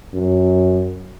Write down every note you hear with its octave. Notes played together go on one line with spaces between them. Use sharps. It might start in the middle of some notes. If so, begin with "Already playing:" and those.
F#2